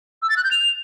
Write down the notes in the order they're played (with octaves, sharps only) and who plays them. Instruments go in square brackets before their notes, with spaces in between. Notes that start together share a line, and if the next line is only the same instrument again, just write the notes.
[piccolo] E6
A6
F#6
G6
F7